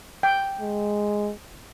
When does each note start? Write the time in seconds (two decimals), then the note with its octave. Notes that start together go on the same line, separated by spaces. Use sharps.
0.23 G5
0.61 G#3